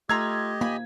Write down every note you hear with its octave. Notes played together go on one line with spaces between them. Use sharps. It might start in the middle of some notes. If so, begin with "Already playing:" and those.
A3 F4 G4 D#5 A#5 E6 G#6
A#3 G#5 B5